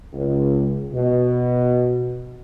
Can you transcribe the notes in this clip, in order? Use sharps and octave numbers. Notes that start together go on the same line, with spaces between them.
C#2
B2